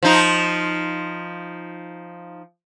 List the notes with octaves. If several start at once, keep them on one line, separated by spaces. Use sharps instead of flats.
F3 D#4